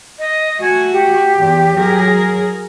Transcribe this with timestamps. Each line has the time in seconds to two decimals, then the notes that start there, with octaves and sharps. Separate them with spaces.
0.19 D#5
0.61 A3 F#4 G#5
0.93 G4
1.37 E2
1.76 F#3 G#4 A#4